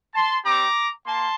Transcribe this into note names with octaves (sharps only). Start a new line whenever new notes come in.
A5 C6
G3 C4 G4 A#5 D6
A#3 A5 C6